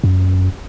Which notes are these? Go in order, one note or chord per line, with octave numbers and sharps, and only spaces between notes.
F#2